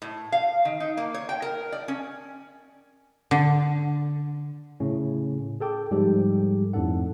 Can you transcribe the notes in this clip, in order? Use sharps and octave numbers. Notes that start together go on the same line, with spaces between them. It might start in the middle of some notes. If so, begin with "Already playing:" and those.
A2
F5
D#3
D#4
A#3
C#5
G5
A#4
D5
C#4
D3
A2 C#3 C#4
G#4 A4 G5 D6
G#2 F3 G3 G4 A4
F2 A2 D4 D#4 A4 F#5